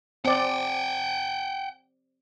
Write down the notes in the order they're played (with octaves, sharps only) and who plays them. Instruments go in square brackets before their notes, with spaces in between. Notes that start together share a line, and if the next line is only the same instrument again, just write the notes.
[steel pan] C4 D5 [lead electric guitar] F#5 G5